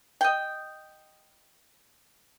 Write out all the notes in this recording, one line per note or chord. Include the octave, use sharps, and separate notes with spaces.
D#5 G5